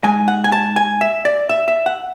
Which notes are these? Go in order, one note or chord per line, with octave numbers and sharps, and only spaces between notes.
G#2 G#3 G#5
F#5
G#5
A5
G#5
E5
D5
E5
E5
F#5